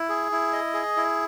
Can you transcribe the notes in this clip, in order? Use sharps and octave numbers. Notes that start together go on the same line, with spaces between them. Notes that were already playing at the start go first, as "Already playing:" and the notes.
Already playing: E4
G#4
E4
D#5
G#4
E4